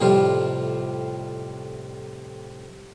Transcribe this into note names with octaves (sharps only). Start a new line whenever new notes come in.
F2 A2 C3 F3 G3 F4